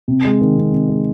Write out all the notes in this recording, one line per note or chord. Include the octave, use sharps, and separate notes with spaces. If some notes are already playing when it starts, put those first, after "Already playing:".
C3
G#3
D#3
C3
C3
G#3